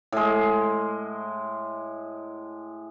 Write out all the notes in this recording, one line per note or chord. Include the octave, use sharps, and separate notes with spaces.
A2 G#3